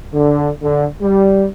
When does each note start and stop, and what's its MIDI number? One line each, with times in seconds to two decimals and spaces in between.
0.14 0.50 50
0.62 0.86 50
1.02 1.48 55